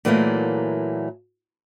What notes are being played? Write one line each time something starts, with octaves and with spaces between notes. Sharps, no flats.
A#2 E3 F#3 G3 A3 A#3